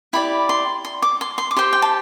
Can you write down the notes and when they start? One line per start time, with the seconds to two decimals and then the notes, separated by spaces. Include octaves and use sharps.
0.13 E4 G4 D5 B5
0.49 C6
0.85 C6
1.02 D6
1.21 C6
1.38 C6
1.51 D6
1.57 G4 C5 C6
1.73 G5
1.82 A5